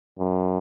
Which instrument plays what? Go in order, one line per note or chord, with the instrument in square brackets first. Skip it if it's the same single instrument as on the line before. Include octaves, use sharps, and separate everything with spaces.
[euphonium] F#2